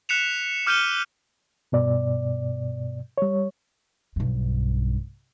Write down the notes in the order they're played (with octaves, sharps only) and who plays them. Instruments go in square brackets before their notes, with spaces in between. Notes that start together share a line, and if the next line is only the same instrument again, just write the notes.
[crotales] F#6 B6 C#7 E7 F7
D6 F6 G6 C#7 D#7 G7
[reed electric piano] G2 B2 D5
G3 C#5
[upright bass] B1 G2